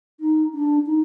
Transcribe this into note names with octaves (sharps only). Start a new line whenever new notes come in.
D#4
D4
D#4